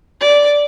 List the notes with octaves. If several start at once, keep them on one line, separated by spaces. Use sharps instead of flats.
D5